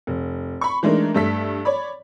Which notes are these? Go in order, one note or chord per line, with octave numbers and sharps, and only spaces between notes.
F1
B5 C#6
E3 G#3 A3 D4 D#4 A#4
G2 A3 A4 B6
C#5 D5 B5